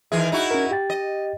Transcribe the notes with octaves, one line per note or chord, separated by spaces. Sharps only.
D#3 E3 G#4 E5
D#4 E4 F#4
C#4 A#4
G4 G5 A6
D#5